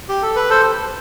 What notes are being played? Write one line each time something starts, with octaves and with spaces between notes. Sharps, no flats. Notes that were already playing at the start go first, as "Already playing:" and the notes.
G4
A4
B4
A4 C5